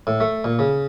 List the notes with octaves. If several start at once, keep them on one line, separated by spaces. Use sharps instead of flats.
A2
A3
A#2
C#3